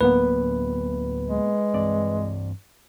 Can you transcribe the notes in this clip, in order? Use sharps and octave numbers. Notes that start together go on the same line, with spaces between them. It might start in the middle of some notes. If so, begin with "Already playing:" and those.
D2 A2 F#3 A#3 B3 B4
G#3
G2 E3 C4 D5